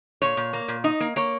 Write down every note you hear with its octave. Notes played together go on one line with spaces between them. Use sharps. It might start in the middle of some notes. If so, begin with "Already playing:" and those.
A#2 C#5
A#2
A#3
A#2
D#4 D#5
A#3
A#3 C#5